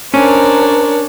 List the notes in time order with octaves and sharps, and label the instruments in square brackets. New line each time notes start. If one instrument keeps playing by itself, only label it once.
[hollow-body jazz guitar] C#4 [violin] D4 C#5 [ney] A#4 [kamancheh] C5 A#5